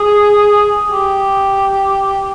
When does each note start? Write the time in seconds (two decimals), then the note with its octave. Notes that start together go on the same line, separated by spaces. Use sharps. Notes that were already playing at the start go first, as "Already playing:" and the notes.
Already playing: G#4
0.91 G4